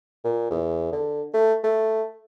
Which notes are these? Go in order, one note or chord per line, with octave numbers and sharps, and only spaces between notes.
A#2
E2
D3
A3
A3